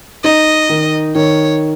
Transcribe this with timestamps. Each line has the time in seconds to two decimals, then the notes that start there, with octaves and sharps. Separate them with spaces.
0.23 D#4 D#5
0.69 D#3
1.15 D#3 C#5